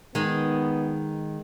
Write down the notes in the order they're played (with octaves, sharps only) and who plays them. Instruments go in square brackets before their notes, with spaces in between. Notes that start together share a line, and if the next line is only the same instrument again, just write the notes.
[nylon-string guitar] D#3 [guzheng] G#3 D#4 [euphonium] B3